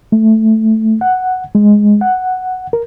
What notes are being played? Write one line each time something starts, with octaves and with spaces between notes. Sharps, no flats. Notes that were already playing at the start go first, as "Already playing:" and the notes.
A3
F#5
G#3
F#5
A#4